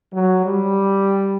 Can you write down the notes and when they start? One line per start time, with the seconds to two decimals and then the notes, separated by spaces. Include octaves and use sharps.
0.12 F#3
0.45 G3